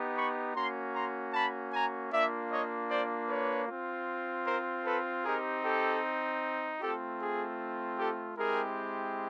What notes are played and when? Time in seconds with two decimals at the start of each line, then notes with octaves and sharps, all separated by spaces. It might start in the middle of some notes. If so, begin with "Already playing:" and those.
Already playing: B3 D#4 G4
0.16 B5 C#6
0.55 A#3 C#4 F#4 A#5 C6
0.94 A#5 C6
1.34 A5 B5
1.73 G#5 A#5
2.12 A#3 D4 F4 D5 E5
2.51 C#5 D#5
2.90 C5 D5
3.29 B4 C#5
3.68 C4 F4
4.46 A#4 C5
4.85 A4 B4
5.25 C4 D#4 G4 G#4 A#4
5.64 G4 A4
6.81 A3 C4 F4 G4 A4
7.21 G#4
7.98 G4 A4
8.37 G#3 C4 E4 G4 G#4 A#4